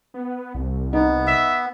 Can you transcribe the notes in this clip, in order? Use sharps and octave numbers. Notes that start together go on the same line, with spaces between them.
B3
C2
B3 D#4
E5